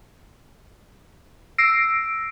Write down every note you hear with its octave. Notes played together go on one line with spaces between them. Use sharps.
E6 A#6 C7 D7